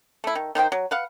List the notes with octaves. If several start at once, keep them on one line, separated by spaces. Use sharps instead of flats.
A3 E4
D#3
D#3 D#4 C5 G5
F#3
B4 F5 F#5